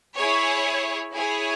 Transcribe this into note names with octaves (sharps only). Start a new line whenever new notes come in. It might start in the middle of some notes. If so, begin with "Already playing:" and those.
E4 G#4 C#5
E4 G#4 C#5